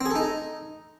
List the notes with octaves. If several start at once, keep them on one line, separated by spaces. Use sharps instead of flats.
C4
G#4
A4
D#4